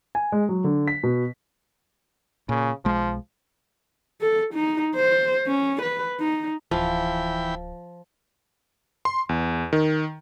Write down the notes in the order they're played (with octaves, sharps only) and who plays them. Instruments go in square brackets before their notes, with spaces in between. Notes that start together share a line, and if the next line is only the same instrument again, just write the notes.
[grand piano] G#5
G#3
F#3
D3
B6
B2
[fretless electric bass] A#2 [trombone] C#3
[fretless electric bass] B1 G#3 [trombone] F3
[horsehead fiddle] A4
D#4
C5
C#4
B4
D#4
[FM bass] D1 [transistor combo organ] E3 G5 B5 [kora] F3
[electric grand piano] C6
E2
D#3